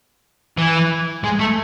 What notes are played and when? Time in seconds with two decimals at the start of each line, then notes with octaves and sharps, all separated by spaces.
0.58 E3
1.24 G#3
1.39 A3